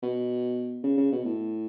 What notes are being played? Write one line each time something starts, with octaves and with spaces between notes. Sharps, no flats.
B2
C#3
C#3
B2
A2